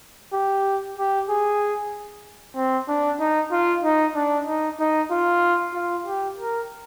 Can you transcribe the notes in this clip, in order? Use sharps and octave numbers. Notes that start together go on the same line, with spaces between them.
G4
G4
G#4
C4
D4
D#4
F4
D#4
D4
D#4
D#4
F4
F4
G4
A#4